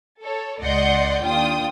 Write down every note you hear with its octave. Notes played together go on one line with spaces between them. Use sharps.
A4 C#5
C#2 D5 D#5 F#5 C6 G6
D#2 D4 F4 G5 D#6